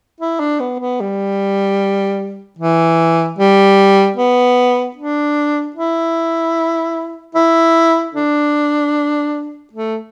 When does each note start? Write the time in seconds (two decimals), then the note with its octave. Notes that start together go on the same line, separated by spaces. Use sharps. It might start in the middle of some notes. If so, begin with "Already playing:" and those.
0.21 E4
0.40 D4
0.60 B3
0.80 B3
1.00 G3
2.59 E3
3.39 G3
4.17 B3
4.96 D4
5.76 E4
7.35 E4
8.15 D4
9.73 A3